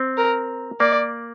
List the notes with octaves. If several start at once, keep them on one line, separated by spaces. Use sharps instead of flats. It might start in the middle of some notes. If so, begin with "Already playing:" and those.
Already playing: C4
A#4
A#3 D5